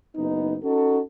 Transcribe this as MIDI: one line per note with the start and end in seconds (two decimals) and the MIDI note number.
0.16 0.56 30
0.16 0.56 59
0.16 0.56 63
0.64 1.01 61
0.64 1.01 63
0.64 1.01 66
0.64 1.01 69